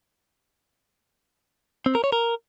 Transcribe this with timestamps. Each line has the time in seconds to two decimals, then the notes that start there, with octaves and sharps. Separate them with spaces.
1.86 C4
1.95 A#4
2.04 C#5
2.12 A#4